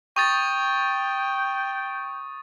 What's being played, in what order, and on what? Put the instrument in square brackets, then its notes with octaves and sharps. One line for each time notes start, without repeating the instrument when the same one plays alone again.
[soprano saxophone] G5 [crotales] C#6 D#6 A6